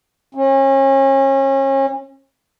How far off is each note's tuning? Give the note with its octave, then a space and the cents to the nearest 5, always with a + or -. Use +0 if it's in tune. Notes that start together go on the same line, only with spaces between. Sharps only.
C#4 -35